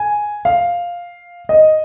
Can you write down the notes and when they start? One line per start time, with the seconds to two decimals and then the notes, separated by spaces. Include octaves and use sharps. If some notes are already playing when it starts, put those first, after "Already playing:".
Already playing: G#5
0.45 F5
1.49 D#5